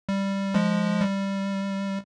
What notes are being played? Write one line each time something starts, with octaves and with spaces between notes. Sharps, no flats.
G3
F3 G#3
G3